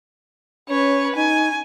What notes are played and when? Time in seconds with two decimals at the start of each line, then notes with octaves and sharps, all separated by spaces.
0.70 C#4 B4 C#5
1.16 D#4 G#5